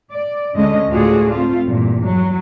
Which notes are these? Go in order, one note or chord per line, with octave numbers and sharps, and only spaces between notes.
D5
D2 D3 G#3 C#4 D#5
D2 A2 F4 F#4 G#4 D5
A3 C4 F4
E2 G2 A#2
F#3